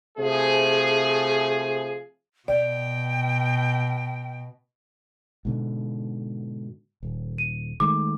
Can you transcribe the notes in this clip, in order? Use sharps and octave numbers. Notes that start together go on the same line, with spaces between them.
C3 F3 A3 G#4
B2 D5 G5
G#2 B2 D3
D#1
D#7
D#3 G#3 A3 D6